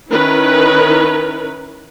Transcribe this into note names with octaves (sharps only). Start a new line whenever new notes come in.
D#3 C#4 E4 A#4 B4